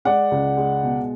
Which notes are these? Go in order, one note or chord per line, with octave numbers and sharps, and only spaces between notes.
G#3 D5 F#5
C#2
G#3
B2